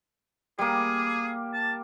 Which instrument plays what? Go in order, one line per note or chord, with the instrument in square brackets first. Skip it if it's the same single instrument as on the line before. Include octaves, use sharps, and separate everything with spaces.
[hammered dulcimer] G3 A#3 [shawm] G#4
[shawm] A5